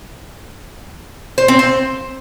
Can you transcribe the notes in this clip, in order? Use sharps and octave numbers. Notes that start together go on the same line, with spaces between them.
C5
C4
C5